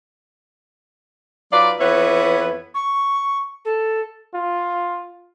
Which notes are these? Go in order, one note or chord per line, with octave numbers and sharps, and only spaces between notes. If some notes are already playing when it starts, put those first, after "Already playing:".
F#3 D#4 F4 B4 D5
F2 E3 B3 B4 C#5 E5
C#6
A4
F4